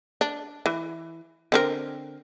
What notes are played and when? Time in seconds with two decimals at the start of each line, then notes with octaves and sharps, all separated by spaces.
0.21 D4
0.66 E3
1.52 D3 C4 A#4